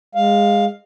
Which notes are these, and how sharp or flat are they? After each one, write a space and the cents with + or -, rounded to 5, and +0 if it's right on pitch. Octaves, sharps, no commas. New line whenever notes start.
G#3 -20 F5 +0